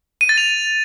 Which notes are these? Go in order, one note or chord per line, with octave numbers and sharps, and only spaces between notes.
D#7
A6
F7